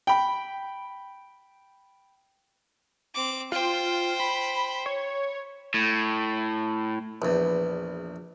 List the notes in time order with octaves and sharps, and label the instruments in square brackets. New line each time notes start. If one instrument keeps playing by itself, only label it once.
[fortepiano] G5 B5
[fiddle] C4 D6
[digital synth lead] F4 [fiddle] C5 G5
[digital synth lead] B5
C#5
[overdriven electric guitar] A2
[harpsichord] A#1 E2